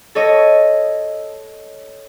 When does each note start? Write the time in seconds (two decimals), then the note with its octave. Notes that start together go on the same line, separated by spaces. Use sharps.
0.15 A4 C#5 D#5